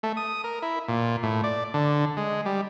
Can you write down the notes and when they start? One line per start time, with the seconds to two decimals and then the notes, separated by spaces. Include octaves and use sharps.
0.03 A3
0.17 D#6
0.44 A#4
0.62 E4
0.88 A#2
1.23 A2
1.44 D5
1.74 D3
2.17 G#3
2.46 G3